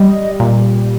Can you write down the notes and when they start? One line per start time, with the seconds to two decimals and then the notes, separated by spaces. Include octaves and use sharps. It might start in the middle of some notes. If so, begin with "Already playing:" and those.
Already playing: G3 D#5
0.40 A#2